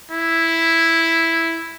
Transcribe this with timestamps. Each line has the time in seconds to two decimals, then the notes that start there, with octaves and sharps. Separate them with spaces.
0.12 E4